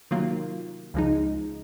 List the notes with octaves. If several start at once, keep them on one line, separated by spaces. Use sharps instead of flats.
C3 D#3 F#3 A#3 F4
C#2 C#3 F3 G#3 D#4